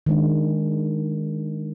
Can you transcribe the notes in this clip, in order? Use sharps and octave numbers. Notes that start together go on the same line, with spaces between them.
D#3 G#3 D4